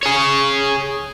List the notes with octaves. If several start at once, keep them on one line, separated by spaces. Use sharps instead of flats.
G#4 C#5